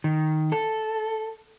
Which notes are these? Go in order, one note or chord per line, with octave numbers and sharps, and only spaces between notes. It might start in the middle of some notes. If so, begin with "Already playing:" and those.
D#3
A4